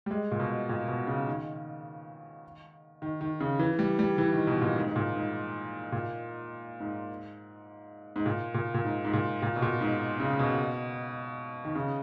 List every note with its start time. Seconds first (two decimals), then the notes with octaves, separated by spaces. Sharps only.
0.06 G3
0.11 G#3
0.31 A#2
0.40 B2
0.69 A#2
0.88 B2
1.07 C#3
1.27 D#3
3.02 D#3
3.21 D#3
3.40 C#3
3.59 E3
3.79 G3
3.99 G3
4.18 E3
4.33 D#3
4.47 B2
4.61 A#2
4.76 G#2
4.87 G#2
4.96 A#2
5.15 G#2
5.92 A#2
6.80 G#2
8.16 G#2
8.26 A#2
8.54 A#2
8.74 A#2
8.84 G#2
9.05 G#2
9.13 A#2
9.42 A#2
9.56 B2
9.62 A#2
9.81 G#2
10.20 C#3
10.39 B2
11.65 D#3
11.75 C#3